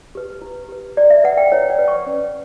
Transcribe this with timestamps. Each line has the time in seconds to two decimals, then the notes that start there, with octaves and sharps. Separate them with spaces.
0.15 G4 B4
0.42 E4
0.69 G4 B4
0.97 E4 D5
1.10 E5
1.24 B4 F#5
1.37 G5
1.52 E4 C#5
1.70 D5
1.79 B4
1.88 C#6
2.06 C#4